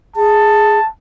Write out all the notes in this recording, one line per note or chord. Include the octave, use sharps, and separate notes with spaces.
G#4 A5